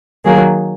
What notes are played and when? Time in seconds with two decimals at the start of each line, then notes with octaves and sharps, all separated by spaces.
0.24 D#3 F#3 A#3 G#4